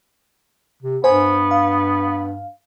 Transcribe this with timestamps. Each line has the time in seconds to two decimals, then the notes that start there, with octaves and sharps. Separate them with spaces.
0.83 C3
1.04 G2 B3 C5 G#5
1.51 F5